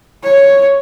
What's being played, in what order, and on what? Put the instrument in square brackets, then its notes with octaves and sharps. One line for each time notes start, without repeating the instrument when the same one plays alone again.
[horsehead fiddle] C#5